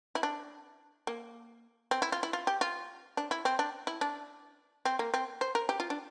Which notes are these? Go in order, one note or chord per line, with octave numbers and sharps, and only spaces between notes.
E4
D4
A#3
C4
E4
F4
E4
F4
G4
F4
D4
E4
C4
D4
E4
D4
C4
A#3
C4
C5
A#4
G4
F4
D4